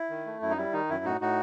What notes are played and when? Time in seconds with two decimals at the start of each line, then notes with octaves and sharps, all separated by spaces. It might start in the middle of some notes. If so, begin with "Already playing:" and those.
Already playing: E4
0.10 D#3
0.26 A3
0.42 F#2 E4
0.50 D#4
0.57 G3 E4
0.73 D#3 D#4
0.89 F#2 E4
1.04 A2 D#4 F#4
1.21 A2 D#4 F#4